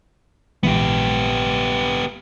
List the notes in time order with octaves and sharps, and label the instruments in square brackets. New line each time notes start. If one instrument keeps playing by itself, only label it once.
[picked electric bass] A#1 E3 G#3 [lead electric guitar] B3 G4